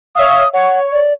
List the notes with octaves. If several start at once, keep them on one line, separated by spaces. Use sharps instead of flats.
C#5 E5 F5 D#6
C#5 F#5
D5